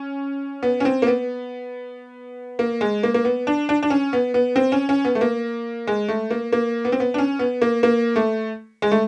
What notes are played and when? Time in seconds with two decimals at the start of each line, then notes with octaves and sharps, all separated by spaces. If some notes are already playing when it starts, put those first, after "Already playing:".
Already playing: C#4
0.63 B3
0.80 C#4
0.85 C4
1.02 A#3
1.07 B3
2.59 A#3
2.81 G#3
3.03 A#3
3.14 A#3
3.25 B3
3.47 D4
3.69 D4
3.83 D4
3.90 C#4
4.13 B3
4.34 B3
4.56 C4
4.72 C#4
4.89 C#4
5.05 B3
5.15 A3
5.21 A#3
5.87 G#3
6.08 A3
6.31 A#3
6.53 A#3
6.85 B3
6.92 C4
7.00 B3
7.14 D4
7.18 C#4
7.39 B3
7.62 A#3
7.83 A#3
8.16 A3
8.82 G#3
8.92 A3